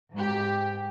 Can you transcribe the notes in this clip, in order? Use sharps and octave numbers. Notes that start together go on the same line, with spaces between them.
G#2 G4